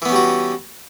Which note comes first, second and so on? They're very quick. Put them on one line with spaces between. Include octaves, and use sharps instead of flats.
E3 B3 C#4 G3 F#4